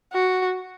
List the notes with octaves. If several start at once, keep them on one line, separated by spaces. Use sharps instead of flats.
F#4